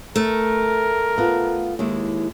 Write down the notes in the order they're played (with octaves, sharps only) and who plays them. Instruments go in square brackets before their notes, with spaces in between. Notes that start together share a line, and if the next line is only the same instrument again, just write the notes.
[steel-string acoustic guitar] A3 [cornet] A#4
[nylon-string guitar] B3 F4 A5
D#2 G#3 E4